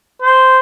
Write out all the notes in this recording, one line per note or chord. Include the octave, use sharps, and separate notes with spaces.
C5